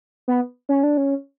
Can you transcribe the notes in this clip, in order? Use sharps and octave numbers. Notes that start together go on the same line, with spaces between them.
B3
C#4
D4
C#4